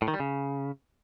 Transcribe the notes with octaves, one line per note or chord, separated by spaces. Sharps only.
A2
D#3
G3
C#3